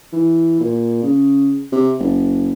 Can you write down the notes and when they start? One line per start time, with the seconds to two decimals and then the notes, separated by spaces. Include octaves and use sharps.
0.12 E3
0.60 A#2
1.03 C#3
1.72 C3
1.99 F#1